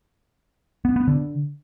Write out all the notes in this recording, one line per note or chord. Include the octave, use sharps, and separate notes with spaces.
B3
B3
D3